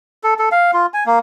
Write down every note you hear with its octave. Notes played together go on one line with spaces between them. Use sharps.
A4
A4
F5
F4
G#5
A#3